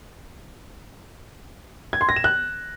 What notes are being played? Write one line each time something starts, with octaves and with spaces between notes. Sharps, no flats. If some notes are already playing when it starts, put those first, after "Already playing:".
G#6
C6
A#6
E7
F#6